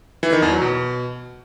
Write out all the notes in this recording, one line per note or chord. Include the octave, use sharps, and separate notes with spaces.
E3
D#3
E2
F#3
B2